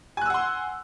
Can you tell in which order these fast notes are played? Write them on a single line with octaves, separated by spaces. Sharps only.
G#5 F#6 E6 F#5 C6